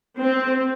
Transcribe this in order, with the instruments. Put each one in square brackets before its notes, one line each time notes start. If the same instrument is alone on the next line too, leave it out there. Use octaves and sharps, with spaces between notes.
[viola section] C4